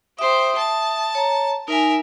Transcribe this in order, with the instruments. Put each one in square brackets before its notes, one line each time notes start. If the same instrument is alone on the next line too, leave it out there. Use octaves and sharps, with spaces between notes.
[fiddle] G4 C5 [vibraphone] E5 D#6
[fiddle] A5
[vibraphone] C#5 A#5
[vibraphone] D#4 G#5 [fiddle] A#4 E5